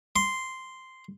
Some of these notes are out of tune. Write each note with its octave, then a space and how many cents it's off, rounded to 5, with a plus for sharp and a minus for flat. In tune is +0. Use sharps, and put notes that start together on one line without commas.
C6 -5